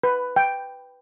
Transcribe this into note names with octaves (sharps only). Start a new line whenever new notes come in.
B4
G5